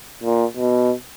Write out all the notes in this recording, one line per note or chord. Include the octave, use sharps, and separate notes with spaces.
A#2
B2